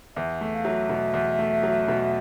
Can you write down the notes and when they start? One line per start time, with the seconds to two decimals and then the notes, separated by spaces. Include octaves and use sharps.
0.16 E2 E5
0.41 A3
0.54 F5
0.65 F#3 E5
0.89 B2
1.14 E2
1.39 A3
1.63 F#3
1.88 B2